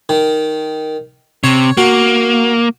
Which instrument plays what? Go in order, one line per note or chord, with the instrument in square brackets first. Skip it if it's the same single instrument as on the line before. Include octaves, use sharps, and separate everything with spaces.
[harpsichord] D#3
[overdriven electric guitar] C3 [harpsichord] C#5
[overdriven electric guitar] A#3 [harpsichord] F#4